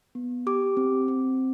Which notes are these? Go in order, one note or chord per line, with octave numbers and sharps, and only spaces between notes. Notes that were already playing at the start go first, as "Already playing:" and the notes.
B3
G4 D6
C4
C4